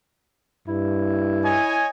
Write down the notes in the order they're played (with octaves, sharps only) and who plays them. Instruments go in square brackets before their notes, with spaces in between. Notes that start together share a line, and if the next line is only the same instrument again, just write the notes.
[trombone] G2 [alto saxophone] E4
[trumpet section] C#5 D#5 G#5